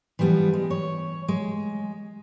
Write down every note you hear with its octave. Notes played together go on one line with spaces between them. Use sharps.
E3 F3 G3 B3
G#3
C#5
G#3